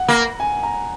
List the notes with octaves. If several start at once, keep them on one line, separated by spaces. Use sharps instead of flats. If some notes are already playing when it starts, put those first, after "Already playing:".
Already playing: F#5
A#3
G#5
A#5